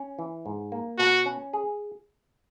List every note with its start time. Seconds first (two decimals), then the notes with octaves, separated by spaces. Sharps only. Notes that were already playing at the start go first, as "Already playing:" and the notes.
Already playing: C#4
0.19 E3
0.46 G#2
0.72 A#3
0.98 B2 F#4
1.26 C#4
1.53 G#4